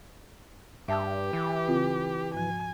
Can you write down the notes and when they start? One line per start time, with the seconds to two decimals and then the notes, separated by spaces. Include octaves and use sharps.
0.88 G2 G4 E5 A5 E6
1.33 E3
1.68 C#3 C4 F4
2.34 G#2 F3 G#5